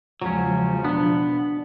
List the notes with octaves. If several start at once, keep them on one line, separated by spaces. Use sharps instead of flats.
E2 C#3 F3 F#3 G#3 C#4
B2 B3 D4